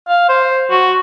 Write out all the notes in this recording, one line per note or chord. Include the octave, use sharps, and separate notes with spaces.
F5
C5
F#4